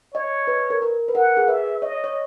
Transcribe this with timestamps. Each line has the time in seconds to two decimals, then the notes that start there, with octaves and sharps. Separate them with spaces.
0.14 C#5 D#5
0.47 B4
0.59 B4
0.70 A#4
0.82 A#4
1.08 B4
1.15 A#4 F#5
1.37 G#4
1.48 B4 E5
1.82 C#5 D#5
2.04 C#5